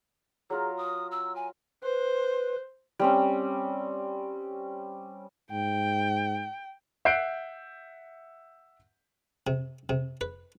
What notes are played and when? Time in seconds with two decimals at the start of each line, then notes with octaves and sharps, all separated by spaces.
0.50 F#3 F4 G#4 A#4
0.77 D#6
1.11 E6
1.36 G#5
1.83 B4 C5
2.99 G3 C4 C#4
5.51 G#2 G5
7.05 E5 F#5 F#6 G6 C7 D7
9.47 C3
9.89 C3
10.21 B4